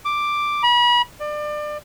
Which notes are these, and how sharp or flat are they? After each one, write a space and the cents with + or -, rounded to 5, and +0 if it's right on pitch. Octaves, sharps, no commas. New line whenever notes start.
D6 +5
B5 -35
D5 +30